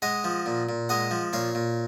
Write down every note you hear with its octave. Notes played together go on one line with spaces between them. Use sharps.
G#3 D#5 F#5
F3
A#2
A#2
G#3 D#5 F#5
F3
A#2 C#5 F5
A#2